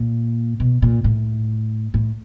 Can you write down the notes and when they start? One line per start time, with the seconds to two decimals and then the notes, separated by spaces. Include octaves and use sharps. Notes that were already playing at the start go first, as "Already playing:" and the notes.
Already playing: A#2
0.60 B2
0.82 A#2
1.04 A2
1.94 A2